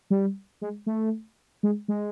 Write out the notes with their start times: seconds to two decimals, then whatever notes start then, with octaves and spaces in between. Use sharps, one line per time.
0.10 G3
0.62 G#3
0.86 A3
1.63 G#3
1.88 G#3